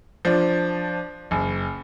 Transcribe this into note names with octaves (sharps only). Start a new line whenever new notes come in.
F3 D4
F#1